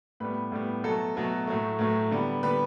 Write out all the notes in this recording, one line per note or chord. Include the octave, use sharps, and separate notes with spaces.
A2 G3 B3 B4
A2 G3 B3
B2 F#3 A3 A4
B2 F#3 A3
A2 F#3 A3
A2 F#3 A3
D3 G3 B3
D3 G3 B3 B4